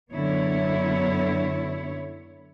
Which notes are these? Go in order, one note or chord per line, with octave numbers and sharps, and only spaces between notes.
F#2 D3 B3 E4 C#5